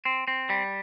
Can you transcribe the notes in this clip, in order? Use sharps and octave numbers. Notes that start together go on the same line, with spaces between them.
C4
C4
G3